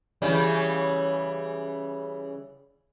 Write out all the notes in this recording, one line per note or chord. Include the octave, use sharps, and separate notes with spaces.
C#3 E3 G3